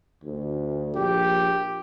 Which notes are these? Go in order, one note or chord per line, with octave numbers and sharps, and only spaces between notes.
D2
A#1 G4